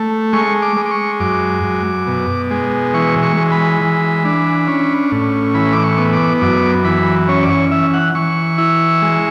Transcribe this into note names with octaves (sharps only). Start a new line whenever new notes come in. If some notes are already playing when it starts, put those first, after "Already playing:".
Already playing: A3
G#3 C#6
D6
G#3
D6
C#6
F#2 D6
F#2
B2
G#3
E3 C#6
C#6
G#3
B5
E3
D4
C#4
A2
E3 B5
D6
C#6
B3
D6
F#2 D6
E3 B5
C#4 C#5
D5
C#5
E3 E5
F#5
E3 C#6
E4
G#3